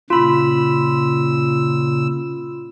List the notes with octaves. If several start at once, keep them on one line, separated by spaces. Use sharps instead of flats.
A#2 C#3 F4 B5 E6